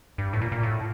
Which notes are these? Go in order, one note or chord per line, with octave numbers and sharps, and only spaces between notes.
G2
A2
A#2
A#2
A2